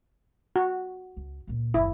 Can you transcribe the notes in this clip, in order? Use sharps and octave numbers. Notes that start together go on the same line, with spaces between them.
F#4
C#2
C#2 A#2
F#1 D#2 E4